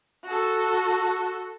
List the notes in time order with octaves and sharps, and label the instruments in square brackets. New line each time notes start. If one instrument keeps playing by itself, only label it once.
[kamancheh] F#4 A4